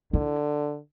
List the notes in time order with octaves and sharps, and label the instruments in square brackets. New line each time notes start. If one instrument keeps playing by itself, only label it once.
[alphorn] D3 [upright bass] E4